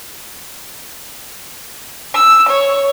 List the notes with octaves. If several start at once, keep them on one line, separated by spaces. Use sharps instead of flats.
E6
C#5